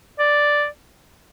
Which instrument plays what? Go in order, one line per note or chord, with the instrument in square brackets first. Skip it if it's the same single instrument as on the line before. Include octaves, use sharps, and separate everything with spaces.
[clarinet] D5